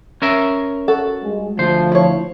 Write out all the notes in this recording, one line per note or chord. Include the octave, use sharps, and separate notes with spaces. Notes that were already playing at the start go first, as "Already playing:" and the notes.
C#4 A#4 E5
F#4 A4
G2 G#3
D2 F3 C5
E4 C#5